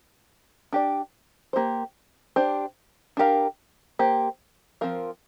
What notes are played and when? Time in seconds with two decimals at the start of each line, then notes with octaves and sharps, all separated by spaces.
0.73 D4 G4 D5
1.53 A#3 G4 C5
2.36 D4 G4 C5
3.17 D4 G4 A#4 F5
3.99 A#3 G4 C5
4.81 F3 C4 A#4 F5